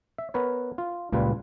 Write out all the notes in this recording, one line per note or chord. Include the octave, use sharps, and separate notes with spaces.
E5
B3 A#4 B4 C#5
F4
C#2 A#2 G3 F4 B4